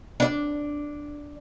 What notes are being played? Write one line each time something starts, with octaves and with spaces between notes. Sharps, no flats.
D4 D5